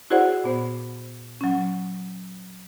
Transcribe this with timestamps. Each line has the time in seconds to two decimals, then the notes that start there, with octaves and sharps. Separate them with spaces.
0.10 E4 F#4 G#4 C5 D5 F#5
0.44 A#2 B3 C5
1.41 F#3 C#4